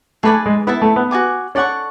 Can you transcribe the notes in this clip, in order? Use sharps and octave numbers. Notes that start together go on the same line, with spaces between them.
A3 G#4 B4 D5 G#5
G#3
B3 E4 A4 E5 A5
A3
B3
F#4 C#5 G#5 D6
C#4 A4 D5 F#5 C#6